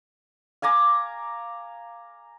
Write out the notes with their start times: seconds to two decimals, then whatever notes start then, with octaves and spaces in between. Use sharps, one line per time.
0.62 F5 G#5 A#5 D6